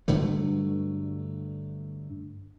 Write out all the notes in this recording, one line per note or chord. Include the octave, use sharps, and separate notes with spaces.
G2 D3 F#3 A3